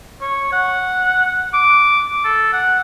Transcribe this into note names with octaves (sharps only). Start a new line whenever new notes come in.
C#5
F#5
D6
A4
F#5